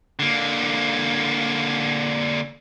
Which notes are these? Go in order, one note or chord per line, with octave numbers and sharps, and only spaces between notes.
D3 A#3